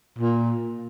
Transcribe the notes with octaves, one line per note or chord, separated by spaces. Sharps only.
A#2